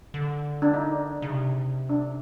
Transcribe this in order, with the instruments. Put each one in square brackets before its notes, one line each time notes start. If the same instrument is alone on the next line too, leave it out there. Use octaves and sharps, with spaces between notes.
[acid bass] D3
[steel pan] D4
D#4
[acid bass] C#3
C3
[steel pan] D4